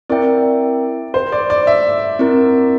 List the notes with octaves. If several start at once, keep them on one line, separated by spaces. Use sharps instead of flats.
C4 E4 A#4 D5 E5 G5
C5
D5
D5
E5
C4 E4 A#4